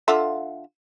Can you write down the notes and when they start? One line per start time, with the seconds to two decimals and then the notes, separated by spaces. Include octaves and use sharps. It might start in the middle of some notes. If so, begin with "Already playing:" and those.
0.08 D3 F4 E5